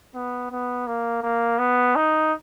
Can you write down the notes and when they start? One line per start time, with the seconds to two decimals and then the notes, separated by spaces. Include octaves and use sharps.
0.15 B3
0.51 B3
0.87 A#3
1.23 A#3
1.58 B3
1.95 D#4